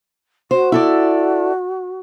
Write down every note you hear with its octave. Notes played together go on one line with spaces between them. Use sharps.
F#4 C5
E4 A4 D5